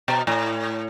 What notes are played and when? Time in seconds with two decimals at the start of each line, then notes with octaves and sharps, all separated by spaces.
0.08 B2
0.27 A2